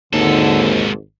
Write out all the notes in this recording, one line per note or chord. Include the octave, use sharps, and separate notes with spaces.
G#1 D#2 G#2 D3 A4